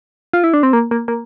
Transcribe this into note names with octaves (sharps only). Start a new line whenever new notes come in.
F4
E4
D4
C4
A#3
A#3
A#3